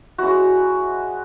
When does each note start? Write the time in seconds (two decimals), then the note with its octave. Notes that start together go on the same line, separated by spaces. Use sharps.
0.18 G#3 C#4 E4 F#4